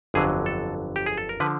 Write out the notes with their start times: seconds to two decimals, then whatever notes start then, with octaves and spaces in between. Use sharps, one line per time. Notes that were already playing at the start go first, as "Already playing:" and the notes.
0.14 G1 F2 D3 F#3 G#4
0.46 A4
0.96 G4
1.06 G#4
1.18 A4
1.29 A#4
1.40 D3 F3 B4